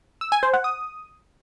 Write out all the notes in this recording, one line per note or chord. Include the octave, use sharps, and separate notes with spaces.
E6
G#5
C5
F#5
D#6